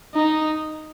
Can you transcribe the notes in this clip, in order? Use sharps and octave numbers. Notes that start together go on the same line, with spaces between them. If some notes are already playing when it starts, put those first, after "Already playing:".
D#4